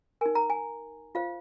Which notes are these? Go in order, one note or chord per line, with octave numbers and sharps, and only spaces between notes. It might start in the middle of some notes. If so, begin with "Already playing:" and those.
D#4 A#4 G#5
A#5
G#5
F4 C5 F5